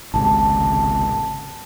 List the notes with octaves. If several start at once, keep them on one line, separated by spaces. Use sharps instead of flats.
G#1 C#2 C3 A5